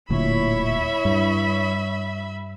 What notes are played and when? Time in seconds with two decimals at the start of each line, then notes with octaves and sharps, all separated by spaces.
0.10 D1 D2 A#2 E4 C#5 E5 B5
1.05 G2